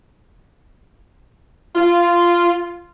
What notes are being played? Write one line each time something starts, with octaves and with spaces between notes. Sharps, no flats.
F4